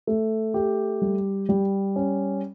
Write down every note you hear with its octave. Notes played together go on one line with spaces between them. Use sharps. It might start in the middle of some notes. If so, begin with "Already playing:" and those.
A3
G4
G3
G3
C#4